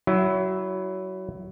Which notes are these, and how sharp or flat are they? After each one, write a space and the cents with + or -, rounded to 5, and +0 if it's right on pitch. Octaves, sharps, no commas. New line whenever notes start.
F#3 +20 E4 +0